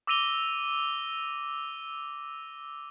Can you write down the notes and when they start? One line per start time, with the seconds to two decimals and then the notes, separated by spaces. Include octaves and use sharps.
0.07 D6 E6 A#6 D#7 F7 G7